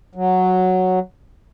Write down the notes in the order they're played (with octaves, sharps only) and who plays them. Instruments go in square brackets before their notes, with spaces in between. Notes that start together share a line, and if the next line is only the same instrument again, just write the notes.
[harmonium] F#3